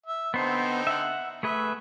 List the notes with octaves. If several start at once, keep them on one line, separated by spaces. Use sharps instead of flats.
E5
D3 B3 C4 D#4 C5
E5 F#5
A3 G#4 B4 E5